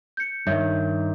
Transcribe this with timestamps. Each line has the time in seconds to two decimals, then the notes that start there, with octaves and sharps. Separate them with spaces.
0.17 G6 C#7
0.47 G2 D#3 C#5 E5 G6